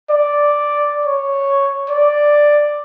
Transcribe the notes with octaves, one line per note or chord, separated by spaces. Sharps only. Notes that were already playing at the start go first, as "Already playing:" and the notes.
D5
C#5
D5